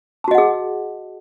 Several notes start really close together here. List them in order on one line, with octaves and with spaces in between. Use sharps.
A5 F#4 D#5 F#5 G#4